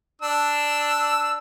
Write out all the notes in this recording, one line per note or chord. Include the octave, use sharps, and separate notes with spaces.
D4 E6